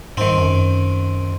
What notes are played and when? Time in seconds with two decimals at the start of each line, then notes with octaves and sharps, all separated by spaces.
0.17 G#2 D#3 C4
0.37 F#2